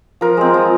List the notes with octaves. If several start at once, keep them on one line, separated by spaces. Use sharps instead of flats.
F3 A#4
G#3 C4
F3